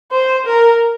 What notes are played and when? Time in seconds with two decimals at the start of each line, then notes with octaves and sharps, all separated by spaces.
0.11 C5
0.46 A#4